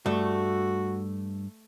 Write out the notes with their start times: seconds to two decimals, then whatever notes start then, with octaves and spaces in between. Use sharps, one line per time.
0.06 G2 A3 F#4